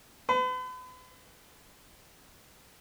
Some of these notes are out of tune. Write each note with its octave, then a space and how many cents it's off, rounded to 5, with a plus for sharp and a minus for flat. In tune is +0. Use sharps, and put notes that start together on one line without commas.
B4 +40